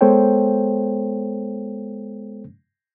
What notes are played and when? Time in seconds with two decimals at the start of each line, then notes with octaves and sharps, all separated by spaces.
0.01 G#3 B3 A4 C5 C#5 G5